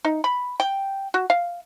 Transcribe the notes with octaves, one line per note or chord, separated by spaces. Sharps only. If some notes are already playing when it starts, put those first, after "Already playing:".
D#4
B5
G5
F#4
F5